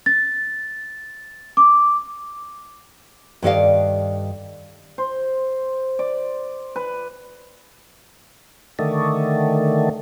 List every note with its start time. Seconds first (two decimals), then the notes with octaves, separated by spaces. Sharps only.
0.06 A6
1.57 D6
3.42 G2 D#3 A4 D5 D#5 F5
4.98 C5
5.99 D5
6.76 B4
8.79 D3 D#3 A3